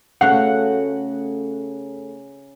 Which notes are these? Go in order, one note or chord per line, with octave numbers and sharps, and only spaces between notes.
C#3 A3 F#4 F5 F#5